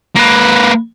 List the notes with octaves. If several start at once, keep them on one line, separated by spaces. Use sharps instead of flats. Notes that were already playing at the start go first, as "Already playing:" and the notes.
A#3 B4